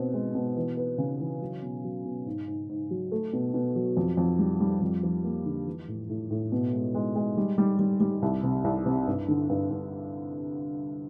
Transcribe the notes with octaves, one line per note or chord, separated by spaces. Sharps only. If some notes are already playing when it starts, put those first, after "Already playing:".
Already playing: B2 C4
G#3
B2
E3
B3
C#3
E3
F#3
B2
F#3
B2
G#2
G#2
G#2
F#3
A3
B2
B2
F#3
F2
F2
G3
G3
F2
F3
A#3
D3
E3
A2
A2
A2
B2
G#3
G#3
G#3
G3
G3
G3
G3
C2
C3
C2
C3
G2
D3
G2
G2